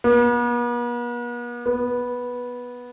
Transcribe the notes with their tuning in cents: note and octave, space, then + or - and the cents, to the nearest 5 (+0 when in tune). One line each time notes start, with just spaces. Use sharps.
B3 -45
B3 -10